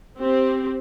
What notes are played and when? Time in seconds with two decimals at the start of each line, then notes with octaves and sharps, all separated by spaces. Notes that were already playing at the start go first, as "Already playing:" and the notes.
0.19 C4 G4